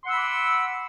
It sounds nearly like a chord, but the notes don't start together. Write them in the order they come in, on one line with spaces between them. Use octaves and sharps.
C6 F#5 E6 B5 D6